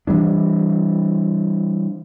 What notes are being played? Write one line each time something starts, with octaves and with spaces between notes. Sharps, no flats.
E3 G3 D4